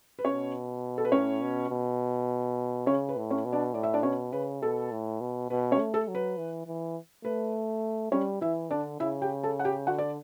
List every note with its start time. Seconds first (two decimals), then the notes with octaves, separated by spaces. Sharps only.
0.19 B4
0.24 B2 C#4 C#5
0.98 A4
1.05 B4
1.12 A2 C#4 C#5
1.41 B2
1.70 B2
2.86 C#3 C#4 C#5
3.09 B4
3.16 A2
3.31 C#4 C#5
3.45 B2
3.53 D4 D5
3.74 A2 D5
3.83 E5
3.94 D4 D5
4.03 B2 C#4 C#5
4.33 C#3 B4
4.62 B2 A4
4.92 A2
5.20 B2
5.50 B2 B4
5.72 C#4 C#5
5.79 A3
5.94 A4
6.08 F#3
6.15 B4
6.37 E3
6.66 E3
7.25 A3 B4
8.12 G3 C#4 C#5
8.41 E3 E4 E5
8.70 D3 D4 D5
9.00 C#3 E4 E5
9.22 G4 G5
9.43 A4 A5
9.59 F#5
9.65 G4 G5
9.87 D3 F#4 F#5
9.98 D5